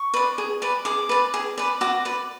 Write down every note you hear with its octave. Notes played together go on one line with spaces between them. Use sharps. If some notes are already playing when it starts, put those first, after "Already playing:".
Already playing: C#6
B4 D5
G#4
B4 D5
G#4 D6
B4 D5
G#4
B4 D5
F#4 D6
B4 D5